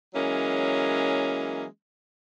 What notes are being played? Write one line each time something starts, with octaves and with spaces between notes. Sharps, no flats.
E3 F#3 G#3 A#3 C#4